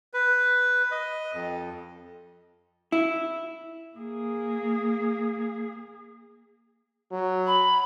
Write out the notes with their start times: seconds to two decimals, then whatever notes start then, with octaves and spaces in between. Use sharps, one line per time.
0.14 B4
0.91 D#5
1.34 F2
2.92 E4
3.96 A#3 G#4
7.12 F#3
7.46 B5